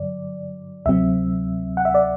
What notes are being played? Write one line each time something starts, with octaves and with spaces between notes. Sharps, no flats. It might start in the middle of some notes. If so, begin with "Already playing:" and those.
Already playing: G2 D3 F#3 D5
D2 C3 F#3 C4 E5
F#5
E5
D5